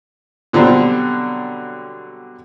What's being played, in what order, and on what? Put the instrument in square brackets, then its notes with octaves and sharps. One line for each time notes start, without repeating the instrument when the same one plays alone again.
[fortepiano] B2 D3 F#3 G3 C4